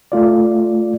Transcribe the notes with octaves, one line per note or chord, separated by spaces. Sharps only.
A3 F4 D5